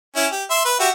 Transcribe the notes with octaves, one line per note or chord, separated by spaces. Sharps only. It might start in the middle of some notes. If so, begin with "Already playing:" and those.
C#4 E4
G4
E5 C6
B4
F#4 G4 E5